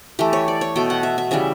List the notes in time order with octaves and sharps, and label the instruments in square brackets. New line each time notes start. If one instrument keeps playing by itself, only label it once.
[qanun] E3 A3 G4
C#5
D5
C#5
B2 A3 G5
F#5
E5
E5
C#3 E3 G3 E5